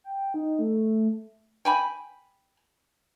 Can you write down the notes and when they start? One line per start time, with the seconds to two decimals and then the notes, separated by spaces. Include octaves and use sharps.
0.04 G5
0.34 D#4
0.59 A3
1.65 G5 G#5 B5